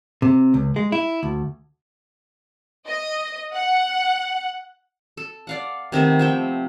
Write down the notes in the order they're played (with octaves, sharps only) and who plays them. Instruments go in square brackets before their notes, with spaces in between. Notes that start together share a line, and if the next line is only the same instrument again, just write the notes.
[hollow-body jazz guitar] C3
C#2
G#3
E4
D2
[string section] D#5
F#5
[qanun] A4
D5 F5 F#5
C3 D#3 A3 B3
F3 E5 G5